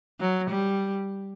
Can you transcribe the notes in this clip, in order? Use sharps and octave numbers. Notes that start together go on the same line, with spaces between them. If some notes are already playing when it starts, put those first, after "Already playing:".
F#3
G3